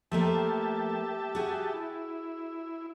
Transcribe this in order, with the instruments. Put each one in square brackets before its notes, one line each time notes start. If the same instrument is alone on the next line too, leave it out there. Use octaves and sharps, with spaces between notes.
[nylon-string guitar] F3 A3 A#3 [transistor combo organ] G4 E5 A5
[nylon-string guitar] F#4 G#4
[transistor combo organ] E4